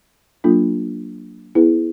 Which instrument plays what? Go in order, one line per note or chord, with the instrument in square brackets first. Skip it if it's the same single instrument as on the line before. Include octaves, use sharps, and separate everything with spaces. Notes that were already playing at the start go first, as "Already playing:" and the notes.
[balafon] F#3 A#3 D4 F4 A4
B3 E4 G#4 B4